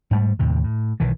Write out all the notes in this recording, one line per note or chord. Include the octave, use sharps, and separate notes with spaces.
G#2 G3 A3
D#2 A2 C3
A2
B1 D#3 E3